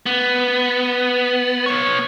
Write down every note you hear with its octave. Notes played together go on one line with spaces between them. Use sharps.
B3
B3 C#5